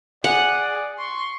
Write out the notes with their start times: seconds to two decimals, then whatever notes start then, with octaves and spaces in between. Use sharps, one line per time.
0.24 G#4 D5 F#5
0.99 C6 C#6